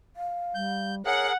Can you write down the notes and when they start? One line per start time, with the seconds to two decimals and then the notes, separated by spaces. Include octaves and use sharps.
0.16 F5
0.55 G3 G6
1.06 G#4 A#4 C#5 F#5